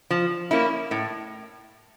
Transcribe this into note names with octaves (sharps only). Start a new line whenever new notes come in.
F3
A#3 C#4 E4
A2